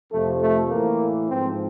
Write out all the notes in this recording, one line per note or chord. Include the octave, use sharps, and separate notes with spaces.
F2 C3 F3 A3
A3
A2 E3 A#3
G#2 F3 C4